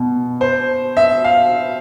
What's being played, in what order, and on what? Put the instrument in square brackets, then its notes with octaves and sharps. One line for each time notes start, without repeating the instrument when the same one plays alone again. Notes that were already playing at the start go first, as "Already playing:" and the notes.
Already playing: [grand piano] B2
[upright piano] C5
E5
F5